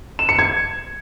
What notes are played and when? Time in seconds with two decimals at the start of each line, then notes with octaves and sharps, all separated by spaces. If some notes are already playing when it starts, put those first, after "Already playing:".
0.19 E7
0.29 C#7
0.39 G#6